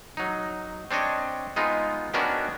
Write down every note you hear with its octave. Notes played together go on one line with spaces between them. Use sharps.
F#3 D#4
C4 D4 C#5 D#5
G#3 B3 D#4 F4
D#3 B3 C#4 D4 F#4 A#4